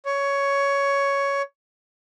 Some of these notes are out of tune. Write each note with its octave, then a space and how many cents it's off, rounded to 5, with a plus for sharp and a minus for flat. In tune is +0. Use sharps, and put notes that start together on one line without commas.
C#5 +10